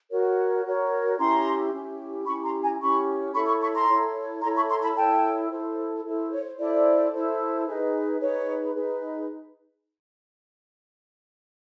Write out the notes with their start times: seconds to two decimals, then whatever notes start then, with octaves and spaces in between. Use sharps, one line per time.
0.10 F#4 A#4 C#5
0.65 F#4 A#4 C#5
1.18 C#4 E4 G4 A#5 C6
1.73 C#4 E4 G4
2.26 C#4 E4 G4 B5 C#6
2.44 A#5 C6
2.62 G#5 A#5
2.80 C#4 E4 G4 B5 C#6
3.34 E4 A4 C#5 B5 C#6
3.47 B5 C#6
3.61 B5 C#6
3.75 A#5 C6
3.88 E4 A4 C#5
4.42 E4 A4 C#5 A#5 C6
4.56 B5 C#6
4.69 A#5 C6
4.83 A5 B5
4.96 E4 A4 C#5 G5 A5
5.50 E4 A4 C5
6.05 E4 A4 C5
6.32 C#5
6.59 E4 A4 C5 D5
7.13 E4 A4 C5
7.67 D#4 G#4 B4
8.20 D#4 G#4 B4 C#5
8.74 D#4 G#4 B4